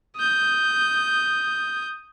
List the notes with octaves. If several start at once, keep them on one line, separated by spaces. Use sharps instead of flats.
D#6 G6